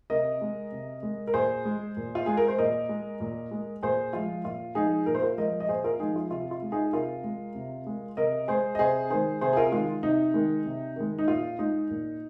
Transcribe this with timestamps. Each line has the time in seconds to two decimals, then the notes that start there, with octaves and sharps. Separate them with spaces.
0.10 C3 A#4 D#5
0.41 G#3
0.72 C3
1.03 G#3
1.27 A#4
1.34 A#2 G#4 C5
1.65 G#3
1.97 A#2
2.15 F4
2.26 G#3 G#4
2.37 A#4
2.48 C5
2.58 A#2 A#4 D#5
2.89 G#3
3.20 A#2
3.51 G#3
3.82 A#2 G#4 C5
4.13 F3 G#3 F4
4.45 A#2 F4
4.75 F3 G#3 D#4 G#4
5.06 A#2 A#4
5.15 C5
5.22 F4 A#4
5.37 F3 G#3 A#4 D#5
5.60 D#5
5.69 A#2 G#4 C5
5.84 F4 A#4
5.99 F3 G#3 D#4 G#4
6.16 F4
6.31 C3 F4
6.51 F4
6.62 G#3
6.72 D#4 G#4
6.93 C3 F4 A#4
7.24 G#3
7.55 C3
7.87 G#3
8.17 C3 A#4 D#5
8.48 G#3 G#4 C5
8.75 D#5
8.79 C3 G#4 C5
9.10 D#3 G#3 G#4 C5
9.41 C3 G#4 C5
9.53 G#4
9.57 F4 A#4
9.72 D#3 G#3 F4
10.03 C3 D#4
10.34 D#3 G#3
10.66 C3
10.96 D#3 G#3
11.19 D#4
11.28 A#2 F4
11.59 G#3 D#4
11.90 A#2